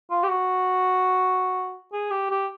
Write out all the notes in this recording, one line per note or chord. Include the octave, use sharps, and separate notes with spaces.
F4
G4
F#4
G#4
G4
G4